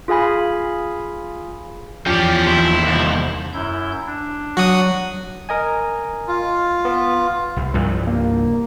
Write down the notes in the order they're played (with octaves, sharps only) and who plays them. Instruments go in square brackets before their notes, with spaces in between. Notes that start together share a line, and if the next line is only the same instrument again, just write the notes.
[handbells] F4 G#4 F5 G#5 B5
[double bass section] E2 [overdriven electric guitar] F3 [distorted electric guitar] C#4 D5 [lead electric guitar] G4
[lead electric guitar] D#2 C5 [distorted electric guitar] E4
[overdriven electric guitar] C2
[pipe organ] F#2 E4 G6
D4
[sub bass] F#3 [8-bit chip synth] F#4 F#5 D#6
[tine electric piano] A#4 D#5 G#5
[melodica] F4
[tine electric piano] B3
[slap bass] C2
C2 G2 F3
[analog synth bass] A#3